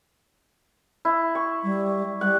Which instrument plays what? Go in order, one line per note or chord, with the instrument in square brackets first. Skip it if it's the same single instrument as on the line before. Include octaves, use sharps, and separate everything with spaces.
[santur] E4
C#6
[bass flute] G3
[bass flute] G3 [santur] F#5